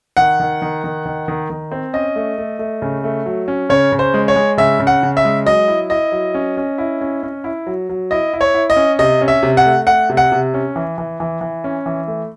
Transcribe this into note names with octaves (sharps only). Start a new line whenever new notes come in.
D#3 F#5
D#3
D#3
D#3
D#3
D#3
D#3
C4
C#4 D#5
A3
A3
A3
C#3
A3
F#3
C#4
C#3 C#5
C#3
C5
G#3
C#5
G#3
C#3 E5
C#3
F#5
C#3
E5
G#3
F#3 D#5
E4
E4 D#5
F#3
C#4
C#4
E4
C#4
C#4
E4
F#3
F#3
E4 D#5
E4
C#5
E4
D#5
C#4
C3 D#5
C#4
E5
C3
F#5
A3
A3 F#5
C3
F#5
C3
C#4
E3
E3
E3
E3
C#4
E3
A3